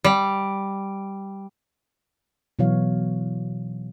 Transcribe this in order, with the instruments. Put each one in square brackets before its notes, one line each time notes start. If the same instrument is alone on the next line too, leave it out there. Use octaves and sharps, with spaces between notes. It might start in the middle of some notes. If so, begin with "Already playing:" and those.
[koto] G3
[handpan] B2 E3 F#3 C#5 F5